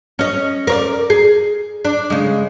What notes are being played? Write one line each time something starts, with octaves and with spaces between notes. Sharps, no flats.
C#4 D#5
A#4 C#5 D5
G#4
D4
C#3 G#3